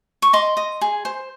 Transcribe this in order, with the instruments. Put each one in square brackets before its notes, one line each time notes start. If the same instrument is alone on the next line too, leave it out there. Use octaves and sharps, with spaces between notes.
[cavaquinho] C#6
D#5 C6 D6
D#5
G#4
C5